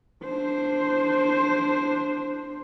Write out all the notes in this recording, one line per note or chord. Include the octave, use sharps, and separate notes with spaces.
D4 C5